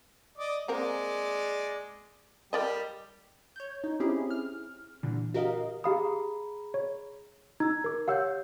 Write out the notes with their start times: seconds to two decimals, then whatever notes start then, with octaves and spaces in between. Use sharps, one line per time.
0.38 D5 D#5
0.68 G#3 A#3 C4 A#4 D5
2.53 G3 G4 A#4 D5 D#5
3.56 C#5 G6
3.84 D#4
4.00 C4 C#4 E4 G4 G#4
4.31 F6
5.03 A#2 D3 E3 G3
5.34 F#4 G4 A#4 D#5 F5
5.84 G4 G#4 F5 A#5 B5 D#6
6.74 C#5
7.60 D#4 E6 G#6
7.84 A#4 D6
8.08 G4 C#5 F5 F#5 E6 G6